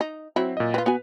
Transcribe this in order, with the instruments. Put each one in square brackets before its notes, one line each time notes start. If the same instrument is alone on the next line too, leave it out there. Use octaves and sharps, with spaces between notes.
[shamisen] D#4
[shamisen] F#3 E4 [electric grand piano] C4
[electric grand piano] A#2 D#5
[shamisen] C4 F4 [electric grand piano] B4
[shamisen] B3 F#4 G#5